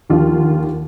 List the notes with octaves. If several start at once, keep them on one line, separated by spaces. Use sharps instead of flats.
D#2 D3 F3 F4